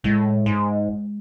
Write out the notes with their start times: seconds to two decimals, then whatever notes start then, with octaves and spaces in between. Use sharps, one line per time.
0.04 A2 G#3
0.46 G#2